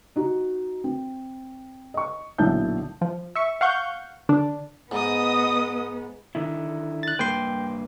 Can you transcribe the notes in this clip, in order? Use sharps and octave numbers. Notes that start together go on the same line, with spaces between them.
D#4 F#4
C4
D#5 C#6
B1 A#2 D3 E4 A5 G6
F3
E5 C#6
F5 F#5 C#6 G6
D3 D4
G#2 B3 D#5 D#6
D3 D#3 E4
F#6 A6
G2 A#3 B4 G5 C6